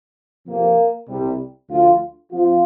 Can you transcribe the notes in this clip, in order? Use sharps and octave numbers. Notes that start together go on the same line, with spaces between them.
F2 C3 F3 A#3
C2 C3 G3
D2 D3 F3 F4
F2 F3 F4